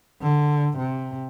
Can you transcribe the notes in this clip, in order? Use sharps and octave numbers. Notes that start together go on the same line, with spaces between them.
D3
C3